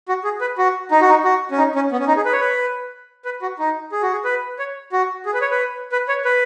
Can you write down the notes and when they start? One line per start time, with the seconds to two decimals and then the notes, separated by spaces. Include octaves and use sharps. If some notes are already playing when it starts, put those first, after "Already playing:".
0.09 F#4
0.24 G#4
0.41 B4
0.58 F#4
0.91 D#4
1.01 F#4
1.09 D#4
1.24 F#4
1.51 C#4
1.58 D#4
1.75 C#4
1.92 B3
2.00 C#4
2.08 D#4
2.16 G#4
2.25 B4
2.33 C#5
2.40 B4
3.25 B4
3.42 F#4
3.59 D#4
3.92 G#4
4.02 F#4
4.12 G#4
4.25 B4
4.59 C#5
4.92 F#4
5.26 G#4
5.34 B4
5.42 C#5
5.51 B4
5.92 B4
6.09 C#5
6.25 B4